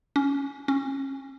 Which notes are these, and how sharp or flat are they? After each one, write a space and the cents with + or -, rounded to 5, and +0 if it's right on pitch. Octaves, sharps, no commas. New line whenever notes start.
C#4 +10
C#4 -30